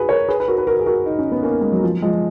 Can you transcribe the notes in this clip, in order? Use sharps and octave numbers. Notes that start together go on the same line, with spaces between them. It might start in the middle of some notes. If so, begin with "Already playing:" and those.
Already playing: F#4 G#4 B4
A#4 C#5
G#4 B4
B4
F#4 A#4
B4
F#4 A#4
G#4
F#4 A#4
D#4
C#4
B3
A#3 C#4
G#3
F#3
F3
F3 G#3